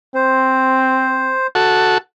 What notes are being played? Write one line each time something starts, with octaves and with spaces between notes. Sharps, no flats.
C4 C5
F#4 A4